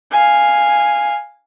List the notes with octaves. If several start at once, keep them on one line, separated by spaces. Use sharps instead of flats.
F5 G#5